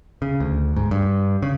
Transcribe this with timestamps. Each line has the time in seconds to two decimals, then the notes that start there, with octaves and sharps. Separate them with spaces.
0.22 C#3
0.40 D2
0.76 G#2
0.91 G2
1.42 C#3